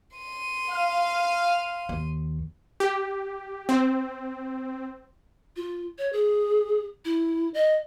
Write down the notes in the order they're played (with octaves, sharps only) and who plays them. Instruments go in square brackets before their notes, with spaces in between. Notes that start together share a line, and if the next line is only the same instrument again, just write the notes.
[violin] C6 D#7
[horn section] F5
[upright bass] D#2
[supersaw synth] G4
C4
[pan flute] F4
C#5
G#4
E4
D#5